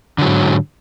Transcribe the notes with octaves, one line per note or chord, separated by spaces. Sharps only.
G#2 D3 F#3